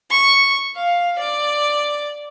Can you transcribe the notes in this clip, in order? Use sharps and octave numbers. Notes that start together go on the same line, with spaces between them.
C#6
F5
D5